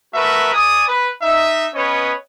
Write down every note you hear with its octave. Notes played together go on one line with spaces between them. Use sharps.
A3 F#4 A#4 B4 E5
D5 G#5 D#6
B4
D#4 E5
B3 C#4 B4 C#5 D#5